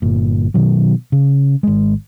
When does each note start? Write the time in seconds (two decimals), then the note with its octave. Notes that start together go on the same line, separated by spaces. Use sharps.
0.02 G1 A#2
0.54 B2 D#3 F#3
1.12 C#3
1.63 G#1 G#3